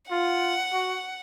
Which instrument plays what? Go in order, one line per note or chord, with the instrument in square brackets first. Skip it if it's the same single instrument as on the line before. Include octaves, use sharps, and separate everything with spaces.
[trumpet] F4 [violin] F#5
[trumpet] F#4